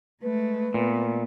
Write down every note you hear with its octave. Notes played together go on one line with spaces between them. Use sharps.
G#3 A3 B4
A#2 A3 B3